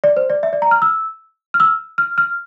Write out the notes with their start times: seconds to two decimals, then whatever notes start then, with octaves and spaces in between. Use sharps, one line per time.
0.04 D5
0.17 C5
0.30 D5
0.43 E5
0.53 D5
0.62 A#5
0.71 F6
0.82 E6
1.54 F6
1.60 E6
1.98 F6
2.18 F6